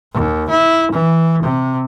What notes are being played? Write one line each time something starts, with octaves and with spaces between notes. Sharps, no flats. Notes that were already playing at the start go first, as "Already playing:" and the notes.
D#2
E4
E3
C3